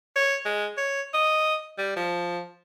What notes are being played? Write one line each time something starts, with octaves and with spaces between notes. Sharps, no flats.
C#5
G#3
C#5
D#5
G3
F3